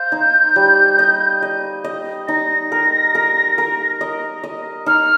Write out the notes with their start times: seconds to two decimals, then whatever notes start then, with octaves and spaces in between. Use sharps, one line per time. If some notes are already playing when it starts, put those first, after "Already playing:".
Already playing: C5 F5 G6
0.12 D#4
0.56 G3
0.99 D#5
1.42 D#5
1.84 D#5
2.28 D#4 A#6
2.72 A#4
3.15 A#4
3.58 A#4
4.01 D#5
4.44 D#5
4.86 D#4 F6